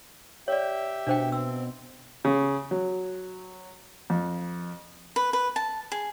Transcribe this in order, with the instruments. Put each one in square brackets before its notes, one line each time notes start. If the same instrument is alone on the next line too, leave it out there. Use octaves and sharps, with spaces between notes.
[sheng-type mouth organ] G4 E5 [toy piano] C#5 D5
[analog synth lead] B2 [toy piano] D4 C5 G5
[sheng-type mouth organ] C4 [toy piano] E6
[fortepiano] C#3
F#3
F2
[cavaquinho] B4
B4
A5
G#4